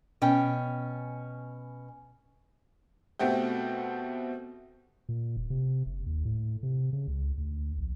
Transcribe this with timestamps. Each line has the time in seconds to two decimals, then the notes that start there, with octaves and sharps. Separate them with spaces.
0.22 B2 C#4 G5
3.19 B2 A3 C4 F#4 G4
5.09 A#2
5.37 E1
5.50 C3
5.86 F#1
6.06 D#2
6.25 A2
6.63 C3
6.93 C#3
7.08 C#2
7.38 D2
7.79 A#1